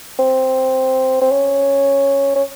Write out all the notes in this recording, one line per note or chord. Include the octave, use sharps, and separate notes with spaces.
C4
C4
C#4
C#4